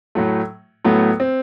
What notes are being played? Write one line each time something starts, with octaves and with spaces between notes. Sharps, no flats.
A2 F#3 A3
A2 F#3 A3 B3
C4